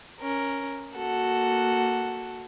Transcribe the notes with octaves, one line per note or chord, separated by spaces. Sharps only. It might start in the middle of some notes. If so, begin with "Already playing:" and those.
C#4 A#4
A#3 F#4 A4 F#5